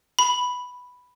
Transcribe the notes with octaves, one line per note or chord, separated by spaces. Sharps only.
B5